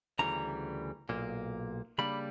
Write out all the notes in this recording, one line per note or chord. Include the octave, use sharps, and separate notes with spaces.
D2 C#3 E3 G3 A#5
B1 A#2 A#3
C#3 G3 A#3 D4 B5